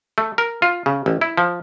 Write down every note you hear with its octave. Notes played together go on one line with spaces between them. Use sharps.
A3
A#4
F4
C#3
A1
E4
F3